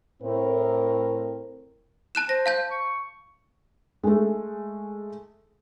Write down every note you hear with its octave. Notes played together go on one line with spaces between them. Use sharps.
A2 C4 A#4
A5 F#6 E7
C5 A#6
F5 A5 G6
C#6
G#3 A3